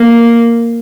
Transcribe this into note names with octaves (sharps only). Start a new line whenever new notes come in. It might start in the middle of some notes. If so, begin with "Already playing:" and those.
Already playing: A#3